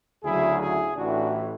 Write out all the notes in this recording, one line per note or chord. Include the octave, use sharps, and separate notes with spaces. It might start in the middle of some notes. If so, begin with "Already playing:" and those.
D2 C#3 F#3 E4 G#4
E4 G#4
A1 A2 E3 D4 F#4